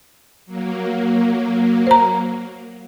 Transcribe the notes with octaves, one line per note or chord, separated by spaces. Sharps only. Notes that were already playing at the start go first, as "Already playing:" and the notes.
F#3 A#3
C5 A#5